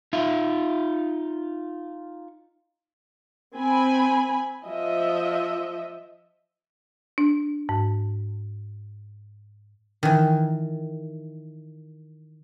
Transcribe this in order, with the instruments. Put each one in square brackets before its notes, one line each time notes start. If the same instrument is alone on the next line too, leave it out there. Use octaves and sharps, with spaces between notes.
[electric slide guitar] D#4 F4 E5
[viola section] C4 G#5 B5
F3 D#5 E5
[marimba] D4
G#2
[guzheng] D#3 E3